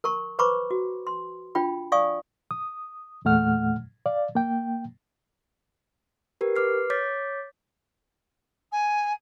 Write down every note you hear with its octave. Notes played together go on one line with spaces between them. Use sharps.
A#4 A#5 C#6
B4 C5 A#5 B5 C#6 D6
F#4
C6
D4 F4 G5 B5
D5 F5 G#5 C#6 D#6
D#6
E2 A#2 A3 F#5 F6
D5 F5
A#3 G5
G4 A#4 B4
B4 D6 F6 C7
C#5 D6 G6 A6 B6
G#5